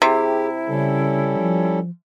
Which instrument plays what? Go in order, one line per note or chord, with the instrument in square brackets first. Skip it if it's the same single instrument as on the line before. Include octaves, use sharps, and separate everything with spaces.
[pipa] C3 [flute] E4 [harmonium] G4 [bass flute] G#4
[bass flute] C#3 [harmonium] G3 C#4 A4
[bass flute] F3